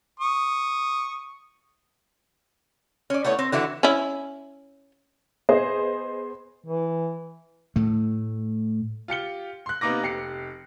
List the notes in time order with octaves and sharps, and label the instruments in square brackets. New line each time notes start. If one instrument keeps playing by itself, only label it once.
[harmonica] C#6 D#6
[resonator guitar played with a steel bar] C#4 D5
A3 B3 E4 C#5
C4
D3 E3 F#4 E5
[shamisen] C#4 E4
[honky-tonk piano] B3 G#4 C5 D#5
[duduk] E3
[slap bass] A2 A3
[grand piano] F4 G4 C#7 G7
C6 F#6
C3 A#3 B3 D#4 D6 A#6
F1 G4 C7 C#7